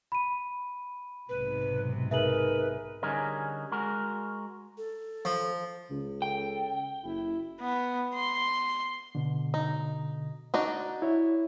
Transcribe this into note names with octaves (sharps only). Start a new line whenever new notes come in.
B5 D#7
B1 G#2 C3 B4
D#4 G#4 A#4 B4 E5 F#7
D3 G3 C#4 D#4 G#4 A#4
G#3 F#4 A#4
A4
F3
C#2 C#3
A4 G5
F#1 E4
B3
C6
B2 D3
D#4
D4 D#4 F#4
E4 C#5 E5